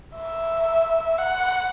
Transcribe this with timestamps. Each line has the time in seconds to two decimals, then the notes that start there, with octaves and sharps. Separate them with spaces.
0.16 E5
1.19 F#5